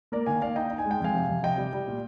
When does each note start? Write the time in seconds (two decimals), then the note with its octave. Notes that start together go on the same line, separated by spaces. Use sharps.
0.12 A#3 A#4 D5
0.26 D#3 F5 G#5
0.41 A#3 D5 F5
0.56 D#4 D#5 G5
0.71 D#4
0.78 G#5
0.85 G#3
0.91 G5
1.01 F2 F5 G#5
1.14 C3
1.29 F2
1.43 C3 D#5 G5
1.58 G3
1.73 G3
1.88 A#2